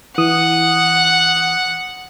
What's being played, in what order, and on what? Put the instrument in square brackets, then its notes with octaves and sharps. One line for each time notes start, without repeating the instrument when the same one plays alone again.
[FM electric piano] E3 D#6 [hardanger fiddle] F#5